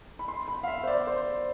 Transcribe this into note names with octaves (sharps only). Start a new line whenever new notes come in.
B5
C6
B5
F5
E5
C5
D5
C5